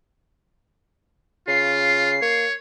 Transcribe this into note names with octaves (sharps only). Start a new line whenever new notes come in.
C#3 F4 C7
A#3 C#5